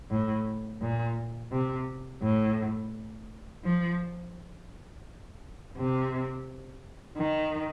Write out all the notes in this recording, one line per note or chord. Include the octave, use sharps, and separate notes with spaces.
A2
A#2
C3
A2
F3
C3
D#3